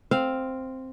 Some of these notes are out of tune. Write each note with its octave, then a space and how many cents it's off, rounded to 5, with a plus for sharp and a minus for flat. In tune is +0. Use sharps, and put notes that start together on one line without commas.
C4 +0 F5 +0